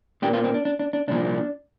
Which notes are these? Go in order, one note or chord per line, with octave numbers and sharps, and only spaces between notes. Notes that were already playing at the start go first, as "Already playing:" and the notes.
A#2 A#3 D4 G4
C4 F4
C4
D4
D4
D4
D4
C2 A#2 F3 D4